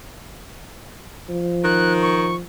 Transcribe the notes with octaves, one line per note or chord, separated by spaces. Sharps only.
F3
D#3 F#6
C#6